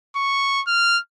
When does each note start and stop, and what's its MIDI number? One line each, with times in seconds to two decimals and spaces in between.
0.16 0.62 85
0.67 0.99 89